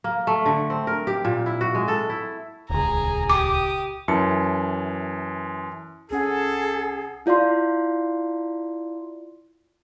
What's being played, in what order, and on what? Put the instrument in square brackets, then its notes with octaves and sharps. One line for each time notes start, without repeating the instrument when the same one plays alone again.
[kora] A#3
A3
D3
C4
A#4
G4
A#2
E4
F#4
G#3
A4
E4
[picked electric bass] D#1 C#2 [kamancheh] G#4 A#5
[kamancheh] G4 D#6 [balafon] D6
[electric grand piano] F#2 E3 A5 C#7
[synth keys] C2 C#4 F#5 [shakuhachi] G#4 [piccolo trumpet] A4
[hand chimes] E4 F4 D5 F5 C6